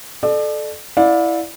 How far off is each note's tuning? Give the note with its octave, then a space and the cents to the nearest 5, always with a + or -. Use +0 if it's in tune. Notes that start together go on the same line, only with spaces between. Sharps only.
A4 -20 D5 +35
E4 +0 D5 +0 F5 +40